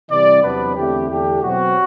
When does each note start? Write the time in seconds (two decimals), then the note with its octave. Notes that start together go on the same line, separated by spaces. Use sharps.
0.09 C3 E3 G3 D5
0.42 E2 C3 F#3 B3 D4 B4
0.76 E2 D3 A3 C4 G4
1.09 E2 D3 A3 D4 G4
1.41 B2 F#3 C4 F#4